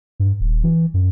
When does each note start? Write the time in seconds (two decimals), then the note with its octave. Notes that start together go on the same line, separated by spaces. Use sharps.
0.20 G2
0.40 D#1
0.64 E3
0.94 F#2